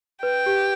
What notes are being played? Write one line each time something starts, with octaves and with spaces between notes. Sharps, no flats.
B4 G5
G4